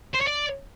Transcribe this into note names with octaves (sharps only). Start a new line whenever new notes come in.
C5
C#5
D5